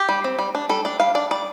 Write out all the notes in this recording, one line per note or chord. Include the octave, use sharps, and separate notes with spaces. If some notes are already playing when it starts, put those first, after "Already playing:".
Already playing: G4
G3
C4
G3
D4
G3 A4
D4 D5
G3 F5
D4 D5
G3 D5